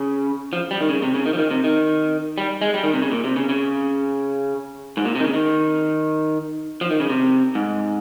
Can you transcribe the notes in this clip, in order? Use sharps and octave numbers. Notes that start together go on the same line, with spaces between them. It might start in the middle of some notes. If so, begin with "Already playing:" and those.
Already playing: C#3
F3
G3
D#3
C#3
C3
C#3
D#3
F3
D#3
C3
D#3
G3
G#3
G3
D#3
C3
C#3
A#2
C3
C#3
C#3
G#2
A#2
C3
D#3
C#3
D#3
F3
D#3
C#3
C3
G#2